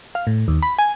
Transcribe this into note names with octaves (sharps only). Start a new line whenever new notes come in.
F5
A2
D#2
B5
G#5